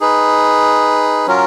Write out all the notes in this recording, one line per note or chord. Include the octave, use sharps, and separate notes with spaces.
D#4 G#4 B4
F#3 C#4 F4 A#4